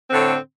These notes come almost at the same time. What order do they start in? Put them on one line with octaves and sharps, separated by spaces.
C4 D3 A2